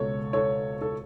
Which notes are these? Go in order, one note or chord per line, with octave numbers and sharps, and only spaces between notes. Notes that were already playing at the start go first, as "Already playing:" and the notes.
Already playing: C#2 B2 A4 C#5
A4 C#5
A4